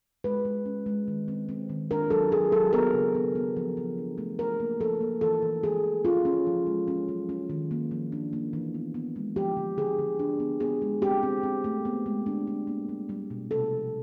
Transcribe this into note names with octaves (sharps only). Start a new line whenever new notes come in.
G#3 B4
G#3
C#4
G#3
D#3
C4
C4
D#3
D4 A#4
F#3 A4
F#3 G#4
F#3 A4
B3 A#4
C#3
B3
B3
F3
F3
D4
A3
F3 A#4
A#3
F3 A4
A#3
E3 A4
E3
E3 G#4
E3
C#4 F4
C#4
F3
G#3
C#4
F#3
C#4
D#3
A#3
F3
D4
A#3
E3
B3
B3
G#3
F3 G4
D3
D3 G#4
D3
D4
B3
B3 G#4
G#3
C4 G4
C4
C4
A3
B3
G#3
D4
D4
A#3
G3
G3
B2
C3 A4
F3